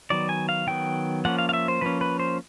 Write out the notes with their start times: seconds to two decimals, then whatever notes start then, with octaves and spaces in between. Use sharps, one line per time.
0.10 D#3 F#3 B3 D5
0.29 G#5
0.49 F5
0.67 D#3 F#3 B3 G5
1.25 F3 A#3 C#4 F#5
1.38 F5
1.49 F5
1.53 E5
1.68 C5
1.81 F3 A#3 C#4 B4
2.01 B4
2.19 C5